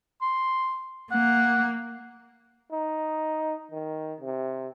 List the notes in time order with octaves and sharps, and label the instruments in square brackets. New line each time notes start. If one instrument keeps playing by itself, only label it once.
[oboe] C6
[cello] A#3 [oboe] F#5
[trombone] D#4
D#3
C3